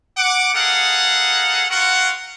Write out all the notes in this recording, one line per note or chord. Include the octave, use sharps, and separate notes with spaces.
F#5 D6
D#4 G#4 A4 F5 F#5
F4 F#4 A#4 F#5